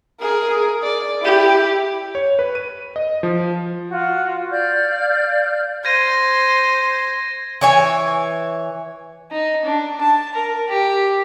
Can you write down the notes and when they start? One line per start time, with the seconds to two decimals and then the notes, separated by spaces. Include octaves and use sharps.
0.20 G#4 A#4
0.82 D5
1.22 E4 G4
2.15 C#5
2.39 B4
2.55 D#7
2.96 D#5
3.23 F3
3.90 F4 F#4
4.52 D5 F5 F6 G6
5.85 C5 G#6 A#6 D#7
7.61 E3 C#5 G#5
9.31 D#4
9.65 D4
10.01 A5
10.34 A#4
10.68 G4